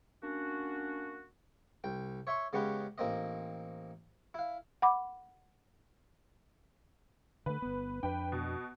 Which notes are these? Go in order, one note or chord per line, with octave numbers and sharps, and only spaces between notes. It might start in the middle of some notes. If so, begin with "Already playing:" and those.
A#3 C#4 D4 F#4
C2 G5
C#5 E5 C6 C#6
C#3 G#3 B3 C#4 G4 B4
A1 A#3 C4 D#5
E4 F5
F#5 B5 D6
D3 A3 B4
G1 B3
F2 D4 B4 G5
B2